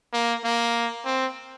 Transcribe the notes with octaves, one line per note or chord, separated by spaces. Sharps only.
A#3
A#3
C4